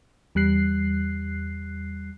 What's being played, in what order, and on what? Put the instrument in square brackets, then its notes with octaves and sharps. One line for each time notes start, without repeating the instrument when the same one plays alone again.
[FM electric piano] E2 G3 F#6 C7